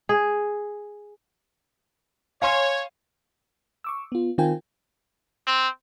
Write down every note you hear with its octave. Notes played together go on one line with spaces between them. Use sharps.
G#4
C#5 F5 G#5 C6
C#6 D6 E6
B3 F4
D#3 C4 F4 A#4 G5 G#5
C4